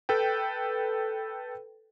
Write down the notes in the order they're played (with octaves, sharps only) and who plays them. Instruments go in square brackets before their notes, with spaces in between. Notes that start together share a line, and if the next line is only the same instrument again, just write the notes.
[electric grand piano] A4 B4 G5